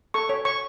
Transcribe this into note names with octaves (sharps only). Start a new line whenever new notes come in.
A4 C#6
C#5
C#5 C#6